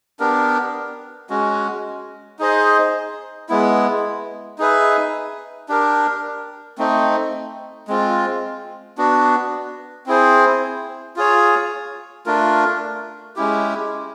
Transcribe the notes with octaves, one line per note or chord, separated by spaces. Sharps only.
B3 D4 G4 A#4
G#3 C#4 F#4
D#4 G#4 C5 D#5
G#3 B3 E4
D#4 G#4 B4 E5
D4 G4 A#4
A3 C4 D#4
G#3 C4 F4
B3 D4 F#4
C4 E4 G#4 C5
F4 G#4 C#5
A3 D4 F4 A#4
G#3 C#4 E4 G4